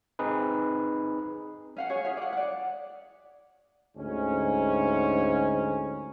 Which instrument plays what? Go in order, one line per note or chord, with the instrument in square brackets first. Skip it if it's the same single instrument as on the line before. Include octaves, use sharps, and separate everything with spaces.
[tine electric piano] C4 D#4 G#4 B4
[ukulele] C#4 F5 F#5
C#4 G#4 C#5
E4 G#4 F5
D5 F#5
D5 F#5
[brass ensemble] D2 G#2 C#4